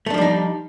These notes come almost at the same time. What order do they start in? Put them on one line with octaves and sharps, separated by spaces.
A3 D4 F3 G3 D#4